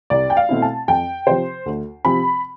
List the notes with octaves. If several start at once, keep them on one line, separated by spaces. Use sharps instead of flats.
C2 D5
G5
F5
B2 A3 C4 E4
A5
F2 G5
C3 F3 C5
D2
C3 F3 C4 B5